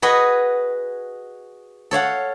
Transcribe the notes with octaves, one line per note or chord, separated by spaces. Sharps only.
F#4 G#4 B4 D#5 F#5
A4 C#5 F5 F#5